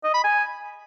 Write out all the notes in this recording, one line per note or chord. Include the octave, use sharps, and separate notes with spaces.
D#5
B5
G#5